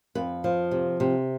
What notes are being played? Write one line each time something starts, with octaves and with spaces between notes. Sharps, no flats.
F2 B4
F3
C3
C3